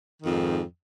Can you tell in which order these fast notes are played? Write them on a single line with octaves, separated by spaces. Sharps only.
D#3 F2 G#2